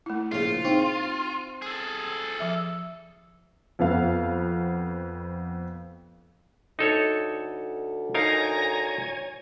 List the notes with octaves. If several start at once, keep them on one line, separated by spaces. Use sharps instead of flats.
A3 E4
A#1 C#3 F4
C4 D#4
G#4 A4
F3 E5
F2 B3 F5
D2 D#4 A4 C#5
D#4 A#4 C#5 F5 G#5 A#5